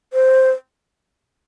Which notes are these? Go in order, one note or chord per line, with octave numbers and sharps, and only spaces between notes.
C5